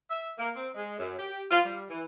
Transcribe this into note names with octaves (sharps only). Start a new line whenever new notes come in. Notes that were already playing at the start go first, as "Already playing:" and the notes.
E5
A#3
C4
G#3
F#2
G4
F4
G3
E3